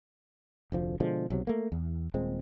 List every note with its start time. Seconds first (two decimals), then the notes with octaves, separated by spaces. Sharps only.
0.72 F1 D2 F3
1.00 B2 D3 F3 G#3
1.30 B1 C3 F#3
1.47 A3 A#3
1.72 E2
2.14 D#1 A#2 G#3 C4